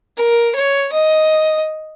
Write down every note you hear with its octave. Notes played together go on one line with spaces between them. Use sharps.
A#4
C#5
D#5